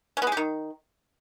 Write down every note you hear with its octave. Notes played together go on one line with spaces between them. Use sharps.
C#4
B3
G#3
G4
D#3